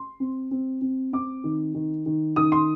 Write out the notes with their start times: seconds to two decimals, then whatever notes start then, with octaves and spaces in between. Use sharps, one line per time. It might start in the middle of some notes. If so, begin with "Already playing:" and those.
Already playing: C6
0.20 C4
0.51 C4
0.81 C4
1.13 C4 D6
1.44 D#3
1.74 D#3
2.06 D#3
2.36 D#3 D#6
2.52 C6